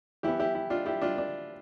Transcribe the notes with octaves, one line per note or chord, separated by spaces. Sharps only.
E3 B3 E4 G4
E4 G4
E4
D4 F4
E4 G4
D4 F4
D4